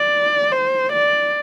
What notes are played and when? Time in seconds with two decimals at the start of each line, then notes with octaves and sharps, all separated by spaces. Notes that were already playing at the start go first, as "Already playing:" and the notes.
Already playing: D5
0.52 C5
0.92 D5